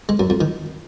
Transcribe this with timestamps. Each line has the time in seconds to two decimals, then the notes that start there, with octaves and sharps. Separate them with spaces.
0.09 G#3
0.20 F#2
0.30 F2
0.41 D#3